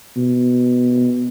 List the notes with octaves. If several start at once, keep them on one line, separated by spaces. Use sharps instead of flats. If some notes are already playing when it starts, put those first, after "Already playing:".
B2